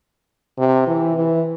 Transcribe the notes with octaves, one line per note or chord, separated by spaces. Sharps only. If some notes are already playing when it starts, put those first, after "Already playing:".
C3
E3
E3